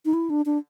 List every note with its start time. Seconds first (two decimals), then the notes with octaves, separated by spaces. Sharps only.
0.05 D#4
0.14 E4
0.30 D4
0.46 D4